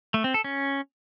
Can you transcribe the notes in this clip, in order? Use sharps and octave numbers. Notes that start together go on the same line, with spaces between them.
A3
C4
A4
C#4